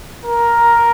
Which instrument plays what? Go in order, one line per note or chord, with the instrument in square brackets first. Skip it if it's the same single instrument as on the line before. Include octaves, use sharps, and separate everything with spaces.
[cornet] A#4